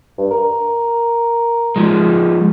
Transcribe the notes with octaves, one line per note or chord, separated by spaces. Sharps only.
G2
A#4
F3 G#3